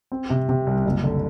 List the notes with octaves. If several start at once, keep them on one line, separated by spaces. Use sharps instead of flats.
C4
C3
C3
C2
F#1
D3